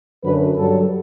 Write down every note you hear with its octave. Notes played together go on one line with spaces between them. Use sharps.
F#2 D3 F#3 B4
G2 F#3 A4